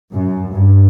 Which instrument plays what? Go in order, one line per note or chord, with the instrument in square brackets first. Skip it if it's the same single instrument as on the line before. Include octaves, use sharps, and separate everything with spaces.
[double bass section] F#2
G2